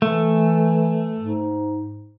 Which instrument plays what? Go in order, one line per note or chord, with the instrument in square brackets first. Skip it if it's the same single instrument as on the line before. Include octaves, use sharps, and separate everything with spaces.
[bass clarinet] E3 [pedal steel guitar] A3
[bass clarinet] G#2